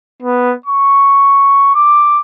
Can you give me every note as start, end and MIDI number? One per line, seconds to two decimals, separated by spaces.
0.22 0.53 59
0.66 1.73 85
1.75 2.19 86